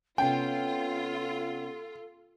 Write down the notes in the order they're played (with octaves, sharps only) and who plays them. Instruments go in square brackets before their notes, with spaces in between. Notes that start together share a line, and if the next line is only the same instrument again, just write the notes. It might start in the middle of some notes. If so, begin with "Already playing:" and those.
[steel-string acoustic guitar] C3 B3 C#4 [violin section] F4 [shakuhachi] A4 [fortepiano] G5